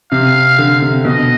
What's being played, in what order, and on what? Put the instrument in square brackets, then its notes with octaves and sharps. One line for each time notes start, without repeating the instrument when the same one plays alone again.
[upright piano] C3 [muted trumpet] F5
[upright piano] D3
C3
[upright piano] B2 [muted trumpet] D#5